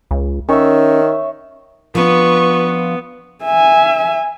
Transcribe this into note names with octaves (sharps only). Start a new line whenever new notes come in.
C#2
D#3 C#4 C#5 E5
F3 B3 D4 F4 B4 C#6
E5 G#5